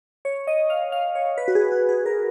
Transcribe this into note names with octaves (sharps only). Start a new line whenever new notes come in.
C#5
D#5
F5
F5
C#5
B4
F#4
G#4
F#4
G#4
A#4